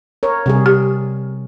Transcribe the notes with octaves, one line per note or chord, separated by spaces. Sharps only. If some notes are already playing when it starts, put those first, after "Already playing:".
A#4 C#5
C3 G3 G#4
G4